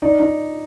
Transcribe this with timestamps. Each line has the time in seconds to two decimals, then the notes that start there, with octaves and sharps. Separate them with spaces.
0.02 D#4 D5
0.20 D#4